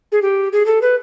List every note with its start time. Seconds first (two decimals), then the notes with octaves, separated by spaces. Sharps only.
0.12 G#4
0.22 G4
0.52 G#4
0.66 A4
0.82 B4